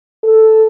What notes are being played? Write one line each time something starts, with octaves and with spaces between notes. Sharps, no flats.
A4